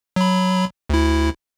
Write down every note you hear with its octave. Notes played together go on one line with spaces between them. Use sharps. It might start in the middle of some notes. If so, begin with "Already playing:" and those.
F#3 B5
D2 E4